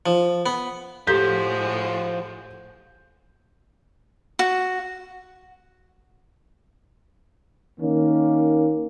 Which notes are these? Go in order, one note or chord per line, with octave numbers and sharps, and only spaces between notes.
F3
B3
A2 F3 G#3 F#4 G4 A4 G6 B6
F#4
D#3 A#3 C#4